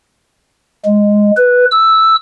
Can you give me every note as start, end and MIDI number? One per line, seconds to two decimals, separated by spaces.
0.85 1.31 56
1.37 1.65 71
1.71 2.16 88